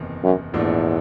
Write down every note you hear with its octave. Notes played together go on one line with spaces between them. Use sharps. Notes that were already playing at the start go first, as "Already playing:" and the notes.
Already playing: F#1 E2 C3 D#3
F#2
A#1 E2 G#2 F3 A3 D4